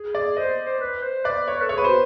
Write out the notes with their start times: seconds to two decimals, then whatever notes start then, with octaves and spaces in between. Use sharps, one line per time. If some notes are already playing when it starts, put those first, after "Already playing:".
Already playing: G#4
0.15 D5
0.36 C5 D#5
0.66 C5
0.81 B4
1.03 C5
1.25 B4 D5
1.48 C#5
1.62 A4
1.69 G#4 C#5
1.78 B4
1.84 F#4 C5